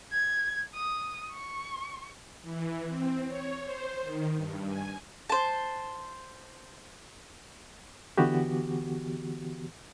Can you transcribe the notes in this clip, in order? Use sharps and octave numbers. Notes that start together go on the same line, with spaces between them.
G#6
D#6
C#6
E3
C4
C#5
C5
D#3
G2
G#5
C5 A5
D3 E3 B3 F#4 G4